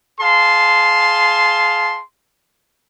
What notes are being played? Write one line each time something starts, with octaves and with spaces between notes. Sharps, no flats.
G#4 F5 A5 C6